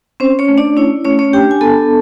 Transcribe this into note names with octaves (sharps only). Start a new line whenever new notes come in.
C4 C#4 C5
C#4 C#5
A3
D4 D5
C#4 E4 C#5
A3 C#4 C#5
C#4 C#5
D4 G4 G5
G#5
B3 A4 A5